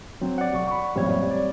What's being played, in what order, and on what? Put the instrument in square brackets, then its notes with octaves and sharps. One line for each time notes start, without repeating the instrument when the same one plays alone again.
[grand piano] F#3 C4
[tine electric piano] D5 F#5
[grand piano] B1 C#6
B5 C#6
[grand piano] A1 F#2 A#2 [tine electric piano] G3 C4 C#5
[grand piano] D5